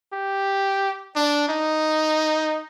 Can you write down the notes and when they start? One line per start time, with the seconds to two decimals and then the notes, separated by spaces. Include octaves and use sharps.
0.13 G4
1.15 D4
1.49 D#4